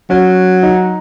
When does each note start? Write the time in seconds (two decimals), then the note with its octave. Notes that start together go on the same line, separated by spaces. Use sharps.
0.10 F#3 C#4
0.63 D#4